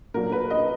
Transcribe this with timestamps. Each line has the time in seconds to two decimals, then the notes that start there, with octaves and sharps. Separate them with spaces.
0.14 A#2 F#3 A#3 D4 A#4
0.32 B4
0.50 D#5